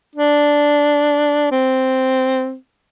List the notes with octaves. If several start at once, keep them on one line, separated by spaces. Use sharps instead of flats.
D4
C4